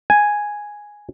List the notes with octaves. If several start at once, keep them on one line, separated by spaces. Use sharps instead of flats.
G#5